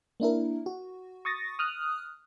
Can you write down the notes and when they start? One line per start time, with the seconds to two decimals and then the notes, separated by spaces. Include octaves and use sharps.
0.20 A#3 D4 E4 A#4
0.66 F#4
1.25 C#6 D#6 A6 A#6
1.59 D#6 F6 F#6